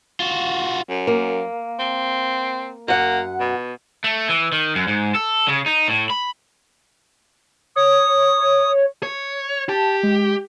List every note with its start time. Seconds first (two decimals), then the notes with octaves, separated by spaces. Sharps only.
0.20 F4 F#4
0.89 F#2
1.07 A#3
1.80 C4
2.88 F#2 A#3 F#5
3.40 B2
4.04 A3
4.29 E3
4.52 D#3
4.75 F#2
4.88 G#2
5.15 A4
5.48 C#3
5.66 D#4
5.88 A2
6.10 B5
7.76 C#5 D#6
9.03 C#5
9.69 G4 A5
10.03 G#3